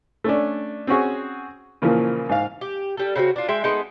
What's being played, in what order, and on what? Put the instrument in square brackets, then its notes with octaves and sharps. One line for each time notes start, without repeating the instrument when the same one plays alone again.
[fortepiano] A3 C#4 D4
C4 C#4 F#4 G#4
A#2 C#3 E3 F3 A#3
G#2 F5
[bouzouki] G4
G3 A4
C#3 C4 D#4 F#4
D4 F4
G#3 E5 G5
G#3 A3 B3 D#4